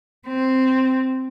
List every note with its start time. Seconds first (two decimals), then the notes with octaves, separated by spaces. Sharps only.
0.28 C4